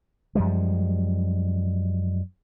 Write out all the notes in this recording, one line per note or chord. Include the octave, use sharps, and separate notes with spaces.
F#2 F3 G3 G#3